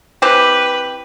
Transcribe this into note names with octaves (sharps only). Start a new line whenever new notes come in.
E3 C4 G4 B4